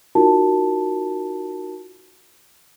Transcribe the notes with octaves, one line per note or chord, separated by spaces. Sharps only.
D#4 F4 F#4 A#4 A5